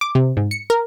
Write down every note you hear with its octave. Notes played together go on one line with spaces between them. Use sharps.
D6
C3
G#2
C#7
A#4